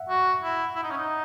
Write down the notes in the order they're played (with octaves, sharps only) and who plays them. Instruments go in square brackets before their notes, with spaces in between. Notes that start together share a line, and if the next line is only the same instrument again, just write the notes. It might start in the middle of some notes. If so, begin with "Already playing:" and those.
Already playing: [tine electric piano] E5 F#5
[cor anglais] F#4
E4
E4
D#4
C#4
D#4